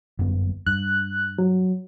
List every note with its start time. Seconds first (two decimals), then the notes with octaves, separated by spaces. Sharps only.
0.19 G1 F#2 B3
0.67 G2 F#6
1.38 F#3